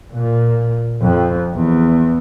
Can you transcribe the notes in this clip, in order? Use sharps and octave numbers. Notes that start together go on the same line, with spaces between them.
A#2
F2
E2